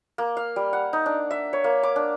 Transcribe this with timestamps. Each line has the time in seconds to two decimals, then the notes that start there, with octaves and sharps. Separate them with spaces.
0.18 A#3
0.37 F5
0.56 G3
0.73 F#5
0.93 D#4
1.06 D4
1.31 E5
1.53 C#5
1.64 A#3
1.83 D6
1.96 D4